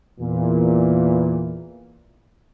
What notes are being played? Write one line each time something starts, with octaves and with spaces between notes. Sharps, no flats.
E2 A#2 E3